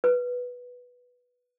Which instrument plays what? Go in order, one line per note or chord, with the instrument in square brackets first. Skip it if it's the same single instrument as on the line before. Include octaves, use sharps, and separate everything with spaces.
[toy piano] B4